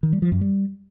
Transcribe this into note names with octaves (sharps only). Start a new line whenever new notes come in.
D#3
G3
F3
F#2
G3